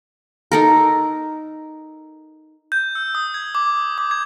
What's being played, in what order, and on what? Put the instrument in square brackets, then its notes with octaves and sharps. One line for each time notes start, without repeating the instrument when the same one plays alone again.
[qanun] D#4 A4 A#4
[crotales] G6
E6
D#6
G#6
D6
D6
G#6